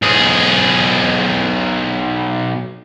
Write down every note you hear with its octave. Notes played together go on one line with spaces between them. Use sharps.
B1 G#4